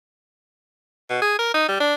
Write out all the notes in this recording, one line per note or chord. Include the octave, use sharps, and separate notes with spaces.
B2
G#4
A#4
D#4
G3
D4